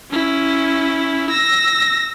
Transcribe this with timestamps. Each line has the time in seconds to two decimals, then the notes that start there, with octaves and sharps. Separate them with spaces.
0.10 C#4 E4
1.30 E6 A#6